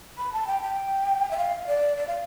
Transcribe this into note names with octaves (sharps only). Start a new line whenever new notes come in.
B5
A5
G5
G5
E5
F5
D5
D5
F5